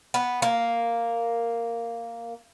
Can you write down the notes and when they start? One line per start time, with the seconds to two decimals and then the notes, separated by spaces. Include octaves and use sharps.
0.14 B3
0.42 A#3